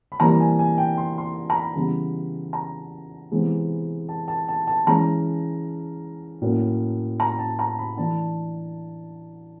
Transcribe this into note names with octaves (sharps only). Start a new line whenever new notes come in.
B5
C3 E3 G3 A#3 D4 A#5
G#5
G#5
G5
C6
C6
A#5
B5
C#3 E3 G3 B3
A#5
C3 E3 G#3 B3
A5
A5
A5
A5
E3 G#3 C#4 A#5
A2 F#3 A#3 C#4
A#5
A5
A#5
B5
E3 A3 D4 A5